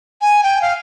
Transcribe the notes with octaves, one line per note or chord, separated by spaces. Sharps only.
G#5
G5
F5